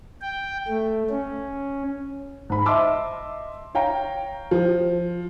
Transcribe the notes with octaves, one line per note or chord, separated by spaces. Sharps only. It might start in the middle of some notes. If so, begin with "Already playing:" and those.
G5
A3
C#4
G#2 B5
D#5 E5 A5 C6 D6 E6
C#5 F5 G5 A#5
F3